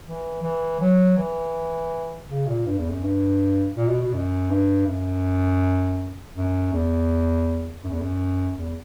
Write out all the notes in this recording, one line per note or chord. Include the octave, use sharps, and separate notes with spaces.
E3
E3
F#3
E3
C#3
A#2
G2
E2
F#2
G2
A#2
B2
B2
F#2
G2
F#2
F#2
E2
F#2
E2
F#2
E2